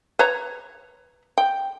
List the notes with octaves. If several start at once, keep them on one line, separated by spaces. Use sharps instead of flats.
B4 C#5 A#5
G5